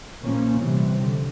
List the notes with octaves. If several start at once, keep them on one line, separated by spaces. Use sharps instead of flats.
A#2 F3 A#3 C#4
C3 E3 G3 C4
D3